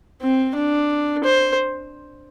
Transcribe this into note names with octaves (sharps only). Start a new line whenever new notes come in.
C4
D4
C5